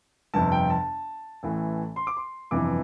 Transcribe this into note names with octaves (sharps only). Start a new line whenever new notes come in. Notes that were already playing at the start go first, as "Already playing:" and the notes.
G1 F2 C3 A5
G5
A5
A1 A2 E3
C6
D6
C6
G1 F2 C3 E3 D6